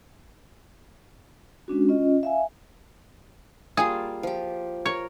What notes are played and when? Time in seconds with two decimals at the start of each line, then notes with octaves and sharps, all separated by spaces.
1.68 G#3 C#4 D4 F#4
1.89 C#4 F4 D#5
2.23 E5 F5 G#5
3.77 G3 A#3 F4 G#4
4.23 F3 G4
4.86 A#4 C#5